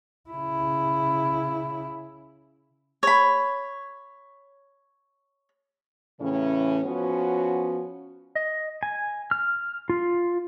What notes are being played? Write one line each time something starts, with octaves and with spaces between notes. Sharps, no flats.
C#3 E4
C#5 B5
A2 C#3 E3 C#4
F3 B3 C#4 F#4
D#5
G#5
F6
F4